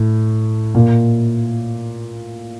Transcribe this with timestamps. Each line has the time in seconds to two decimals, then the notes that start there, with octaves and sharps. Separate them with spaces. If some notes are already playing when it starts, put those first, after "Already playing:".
Already playing: A2
0.75 A#2